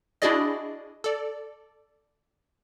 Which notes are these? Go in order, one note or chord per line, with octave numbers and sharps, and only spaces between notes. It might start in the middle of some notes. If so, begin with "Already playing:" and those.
D4 E4 F#4 G#4 D5 D#5
A4 D5